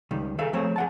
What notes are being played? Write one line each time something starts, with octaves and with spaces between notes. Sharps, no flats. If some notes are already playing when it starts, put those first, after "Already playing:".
C#2 D#3 G3
G#4 A4 E5 F5
F3 A3 C4 C5 C#5
G#4 F#5 A5